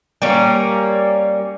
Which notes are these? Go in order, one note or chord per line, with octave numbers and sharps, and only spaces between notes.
G3 A#3 C#4